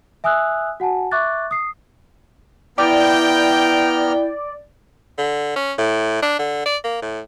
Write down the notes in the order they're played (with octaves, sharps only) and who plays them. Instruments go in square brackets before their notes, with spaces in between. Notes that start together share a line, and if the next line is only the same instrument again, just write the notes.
[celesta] E5 G#5 D#6 E6 F#6
F#4 F#5 G#5 A5
E5 C#6 D6 F#6 A6
D#6 C7
[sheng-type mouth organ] B3 A#5 F6 [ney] E4 [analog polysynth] D5 [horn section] G5
[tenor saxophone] D3
C#4
A2
D4
D3
D5
A#3
A2